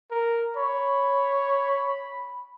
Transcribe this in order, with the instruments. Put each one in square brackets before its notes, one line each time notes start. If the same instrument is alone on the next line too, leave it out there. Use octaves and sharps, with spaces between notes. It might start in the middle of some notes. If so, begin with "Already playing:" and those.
[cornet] A#4
[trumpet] C#5 [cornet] B5